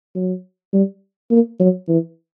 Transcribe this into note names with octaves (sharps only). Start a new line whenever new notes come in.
F#3
G3
A#3
F#3
E3